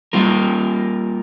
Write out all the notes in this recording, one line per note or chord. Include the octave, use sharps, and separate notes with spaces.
G3 A#3 F4 A#4